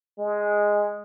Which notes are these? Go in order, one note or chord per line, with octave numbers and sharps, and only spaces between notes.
G#3